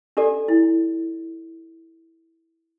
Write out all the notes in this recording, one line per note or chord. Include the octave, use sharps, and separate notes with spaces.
D4 G4 A4 D5
E4